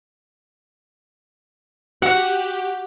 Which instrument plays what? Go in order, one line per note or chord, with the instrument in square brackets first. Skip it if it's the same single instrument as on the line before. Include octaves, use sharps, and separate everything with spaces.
[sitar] F#4 [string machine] G4 [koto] F#5